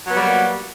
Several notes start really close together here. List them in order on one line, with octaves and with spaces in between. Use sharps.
F#3 B3 F#4 G3 A#3